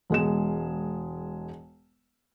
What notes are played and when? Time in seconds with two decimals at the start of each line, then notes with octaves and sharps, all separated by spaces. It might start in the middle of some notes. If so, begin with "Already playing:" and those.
0.10 E1 G#3 E7